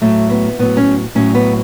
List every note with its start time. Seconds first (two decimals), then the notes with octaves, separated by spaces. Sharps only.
0.02 A2 F#3 A3
0.30 B3
0.59 A2 F#3 B3
0.77 C#4
1.15 A2 F#3 C#4
1.35 B3